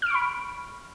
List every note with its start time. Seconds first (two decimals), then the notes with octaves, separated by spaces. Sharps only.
0.02 F6
0.06 D7
0.10 C#6
0.14 B5